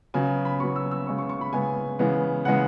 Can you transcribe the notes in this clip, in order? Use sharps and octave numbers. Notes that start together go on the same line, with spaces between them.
C#3 F#3 B3 G#5
B5
C#3 F#3 B3 C#6
E6
E6
C#3 G#3 B3 C#6
C#6
C#6
B5
C#3 G#3 B3 G#5
C#3 E3 G#3 B3
C#3 E3 G#3 B3 F#5